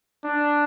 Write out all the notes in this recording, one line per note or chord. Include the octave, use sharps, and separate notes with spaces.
D4